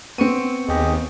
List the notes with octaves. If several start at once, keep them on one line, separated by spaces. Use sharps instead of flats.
B3 C4 C#6 C#7 D#7
D#2 G4 G#4 D#5